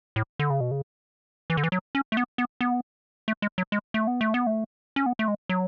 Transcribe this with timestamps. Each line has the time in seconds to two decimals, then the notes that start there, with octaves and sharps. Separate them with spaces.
0.16 A2
0.39 D3
0.50 C#3
0.61 B2
0.71 C#3
1.50 E3
1.57 D3
1.64 E3
1.72 F#3
1.95 C#4
2.12 A3
2.17 B3
2.38 B3
2.61 B3
3.28 A3
3.42 G#3
3.58 F#3
3.72 G#3
3.94 A3
4.07 B3
4.21 A3
4.34 B3
4.47 A3
4.96 C#4
5.06 B3
5.19 A3
5.28 G#3
5.49 F#3